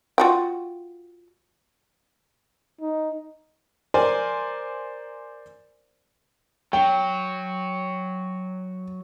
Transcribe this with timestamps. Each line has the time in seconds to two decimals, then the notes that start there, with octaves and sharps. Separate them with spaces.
0.18 F4 F#4 G5
2.81 D#4
3.94 A#4 C5 D5 G#5
6.73 F#3 G5